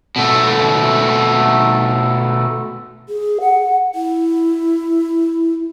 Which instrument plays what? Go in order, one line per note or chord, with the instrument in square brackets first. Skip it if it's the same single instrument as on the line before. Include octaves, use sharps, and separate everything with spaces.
[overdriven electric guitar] B2 A3
[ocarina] G#4
F#5
E4